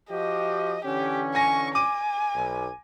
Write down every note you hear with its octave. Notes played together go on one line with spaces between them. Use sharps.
F3 F#4 G4 D#5
D3 E3 C#4 G4
G#5 C#6 A#6
G#5 D6 D#7
B1